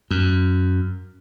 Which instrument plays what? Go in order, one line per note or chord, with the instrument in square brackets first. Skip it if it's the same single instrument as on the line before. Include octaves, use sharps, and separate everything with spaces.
[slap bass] F#2